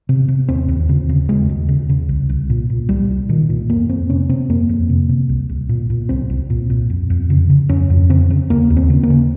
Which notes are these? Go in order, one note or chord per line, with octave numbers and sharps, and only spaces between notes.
C3
C3
D#2 C4
D#2
C#3
C#3
D#2 G#3
D#2
C#3
C#3
C2
C2
A#2
A#2
C2 G3
C2
A#2 D#3
A#2
F2 A#3
F2 C4
C3 C#4
C3 C4
F2 A#3
F2
C3
C3
C2
C2
A#2
A#2
C2 C4
C2
A#2
A#2
F2
F2
C#3
C#3
F2 C#4
F2
C#3 C4
C#3
D#2 A#3
D#2
C4
C#3
A#3
C#3